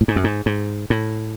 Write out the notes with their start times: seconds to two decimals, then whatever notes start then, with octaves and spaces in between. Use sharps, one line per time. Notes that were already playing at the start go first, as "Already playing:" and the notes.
0.01 A2
0.08 G#2
0.16 F#2
0.24 G#2
0.46 G#2
0.90 A2